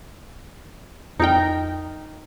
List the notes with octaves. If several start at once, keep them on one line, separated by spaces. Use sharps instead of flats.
F2 D#4 A#4 G5